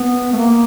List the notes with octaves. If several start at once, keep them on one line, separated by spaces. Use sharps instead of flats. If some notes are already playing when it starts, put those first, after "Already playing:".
Already playing: B3
A3
A#3